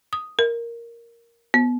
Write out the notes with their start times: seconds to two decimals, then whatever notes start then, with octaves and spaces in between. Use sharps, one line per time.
0.13 D#6
0.39 A#4
1.54 B3